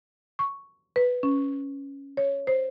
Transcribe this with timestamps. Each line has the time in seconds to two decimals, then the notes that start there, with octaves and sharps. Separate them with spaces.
0.39 C#6
0.96 B4
1.23 C#4
2.17 C#5
2.47 C5